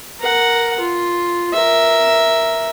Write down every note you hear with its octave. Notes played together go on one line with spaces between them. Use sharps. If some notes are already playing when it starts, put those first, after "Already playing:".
A#4 F#5
F4
A#4 E5